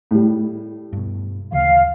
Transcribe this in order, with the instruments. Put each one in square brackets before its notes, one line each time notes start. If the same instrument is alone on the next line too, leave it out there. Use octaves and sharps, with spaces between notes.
[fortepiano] A2 G3
[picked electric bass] G2 B2
[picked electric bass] D2 C#3 E3 [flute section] F5